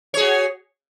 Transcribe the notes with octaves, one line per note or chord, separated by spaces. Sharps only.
F#4 G#4 C#5